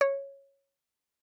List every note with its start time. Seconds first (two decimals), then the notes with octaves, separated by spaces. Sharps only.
0.01 C#5